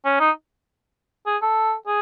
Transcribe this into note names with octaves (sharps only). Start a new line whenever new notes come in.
C#4
D#4
G#4
A4
G#4